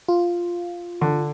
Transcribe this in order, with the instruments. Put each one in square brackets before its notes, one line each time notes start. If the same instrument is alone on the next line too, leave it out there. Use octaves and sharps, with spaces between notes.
[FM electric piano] F4
[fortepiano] D3